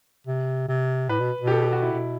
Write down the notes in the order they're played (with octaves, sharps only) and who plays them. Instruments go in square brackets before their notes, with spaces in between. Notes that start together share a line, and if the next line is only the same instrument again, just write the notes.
[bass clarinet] C3
C3
[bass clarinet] A2 [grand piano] B4
[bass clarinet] B2
B2
[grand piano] G4
A4
G4
F#4
E4
[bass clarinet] B2